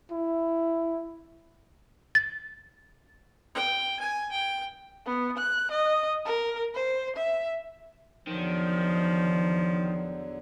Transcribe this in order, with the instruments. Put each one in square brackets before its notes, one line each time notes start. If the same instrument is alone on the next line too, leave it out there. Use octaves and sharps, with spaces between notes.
[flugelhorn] E4
[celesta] A6
[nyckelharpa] G5
G#5
G5
[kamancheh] B3
F#6
D#5
A#4
C5
E5
[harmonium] E2 D3 F#3 [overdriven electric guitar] D#3 [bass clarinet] F3